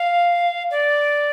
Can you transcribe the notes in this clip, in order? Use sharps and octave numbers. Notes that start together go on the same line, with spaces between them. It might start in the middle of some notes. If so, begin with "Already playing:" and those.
Already playing: F5
D5